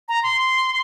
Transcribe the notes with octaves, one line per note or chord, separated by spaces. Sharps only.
A#5
C6